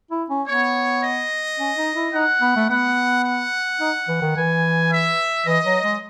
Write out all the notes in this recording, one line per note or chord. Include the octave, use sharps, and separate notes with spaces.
E4
C#4
B3 C#5
D#5
C#4
D#4
E4
D#4 F#5
B3
A3
B3 F#5
F#5
D#4
E3
D#3
E3 G#5
E5
E3 D#5
F#3
G#3